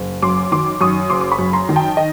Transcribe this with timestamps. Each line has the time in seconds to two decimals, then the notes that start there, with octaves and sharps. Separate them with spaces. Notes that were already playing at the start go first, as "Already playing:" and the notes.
Already playing: F#1
0.22 F#2 C6 D6
0.52 D#3 C6 D6
0.81 F#2 C#6 D#6
1.10 F#1 C6 D6
1.21 D6
1.32 B5 C#6
1.39 F#2
1.53 A#5 C6
1.69 D#3
1.76 G5 A5
1.97 D#5